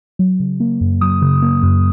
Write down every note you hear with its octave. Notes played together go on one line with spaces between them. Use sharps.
F#3
C#3
A#3
F#2
F#3 D#6
C#3
A#3
F#2